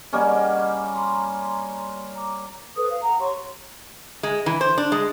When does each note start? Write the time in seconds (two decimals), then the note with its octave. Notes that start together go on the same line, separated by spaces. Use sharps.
0.13 G3 A#3 C#4 D#5 F#5
0.92 A#5 C6
2.15 A#5 D6
2.76 A4 B4 C5 D#6
2.89 F5
3.01 F#5 A#5
3.19 G4 C#5 C6 C#6
4.23 G#3
4.46 E3
4.61 C5
4.78 D4
4.92 G#3